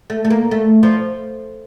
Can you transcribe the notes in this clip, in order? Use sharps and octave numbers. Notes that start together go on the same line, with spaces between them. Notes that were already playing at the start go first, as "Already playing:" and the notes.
A3
A3
A#3
A3
F3